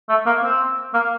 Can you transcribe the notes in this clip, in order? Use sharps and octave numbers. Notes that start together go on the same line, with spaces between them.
A3
A#3
C4
A#3